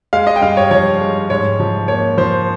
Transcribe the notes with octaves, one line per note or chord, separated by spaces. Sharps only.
G#3 F5
D#5
G5
G2 F5
C#5
F3 C#5
G#3
G#2 C#5
F3
A#3 C#5
F3 C5